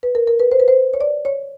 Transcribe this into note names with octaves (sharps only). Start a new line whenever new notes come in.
B4
A#4
A#4
B4
C5
B4
C5
C#5
D5
C#5